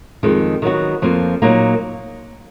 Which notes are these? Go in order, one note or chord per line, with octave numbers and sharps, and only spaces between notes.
F2 D#3 G#3
D#3 F#3 B3 F#4
F2 F3 A#3
A#2 F#3 A#3 D#4